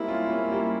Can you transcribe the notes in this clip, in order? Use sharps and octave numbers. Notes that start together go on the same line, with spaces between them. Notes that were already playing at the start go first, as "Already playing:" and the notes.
Already playing: G3 G#3 A#3 C4 E4
C#4 F4
A#3 C#4
G3 A#3